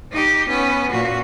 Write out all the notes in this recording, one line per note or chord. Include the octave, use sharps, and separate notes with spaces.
D#4 G4
B3 C#4
A#2 F#4